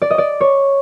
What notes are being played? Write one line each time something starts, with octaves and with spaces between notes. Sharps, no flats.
D5
D#5
D5
C#5